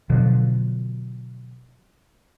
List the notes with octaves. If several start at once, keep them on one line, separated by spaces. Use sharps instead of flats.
B2 D3 F3 F#3